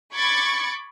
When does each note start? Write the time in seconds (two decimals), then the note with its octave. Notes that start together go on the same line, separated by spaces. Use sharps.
0.12 B5 C#6 D6 G#6 A6 C#7